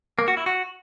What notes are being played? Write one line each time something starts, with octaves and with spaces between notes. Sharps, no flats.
A#3
F#4
E4
F#4